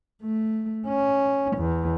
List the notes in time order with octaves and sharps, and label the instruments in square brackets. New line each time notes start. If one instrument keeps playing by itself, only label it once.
[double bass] A3
C#4
E2